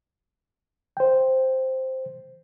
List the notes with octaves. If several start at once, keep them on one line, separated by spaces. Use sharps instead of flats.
C5 G5